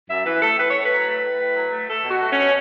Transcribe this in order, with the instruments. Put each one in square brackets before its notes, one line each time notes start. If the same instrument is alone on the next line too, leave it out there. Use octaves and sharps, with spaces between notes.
[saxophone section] F#2 E5
E3 B4
A3 A4
A2 B4
A2 C#5
B4
F#3
A3
A2
A2
F#3
A3
A3 A4
B2
F#4
A3
C#4
B2